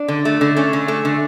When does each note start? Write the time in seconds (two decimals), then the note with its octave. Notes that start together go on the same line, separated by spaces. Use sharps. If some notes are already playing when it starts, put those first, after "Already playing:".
Already playing: D4
0.08 D3
0.25 A3
0.41 D3
0.56 A3 C#4
0.73 D3
0.88 A3
1.05 D3